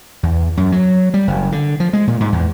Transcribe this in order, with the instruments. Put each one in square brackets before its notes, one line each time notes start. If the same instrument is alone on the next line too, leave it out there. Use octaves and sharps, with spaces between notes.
[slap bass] E2
F#2
F#3
G3
F#1
D3
F3
G#3
A#2
G#2
E2